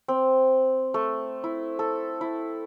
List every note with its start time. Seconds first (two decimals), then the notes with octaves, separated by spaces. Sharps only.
0.08 C4
0.94 A3
1.44 E4
1.79 A4
2.21 E4